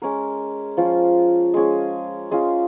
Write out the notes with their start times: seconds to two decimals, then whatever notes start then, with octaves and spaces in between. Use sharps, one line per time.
0.02 G#3 C#4 A#4
0.77 F3 C#4 F4
1.54 G#3 C#4 G#4
2.31 G#3 C#4 F4